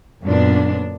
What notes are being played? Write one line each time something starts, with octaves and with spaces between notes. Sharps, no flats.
F#2 A#2 D3 B3 D4